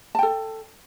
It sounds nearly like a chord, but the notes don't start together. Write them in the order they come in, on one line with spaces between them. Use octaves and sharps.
A5 G5 A4